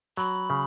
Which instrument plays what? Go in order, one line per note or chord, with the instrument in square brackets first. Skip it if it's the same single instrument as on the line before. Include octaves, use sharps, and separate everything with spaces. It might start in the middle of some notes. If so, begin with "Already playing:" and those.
[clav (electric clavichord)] F#3 [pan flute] B5
[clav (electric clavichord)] C#3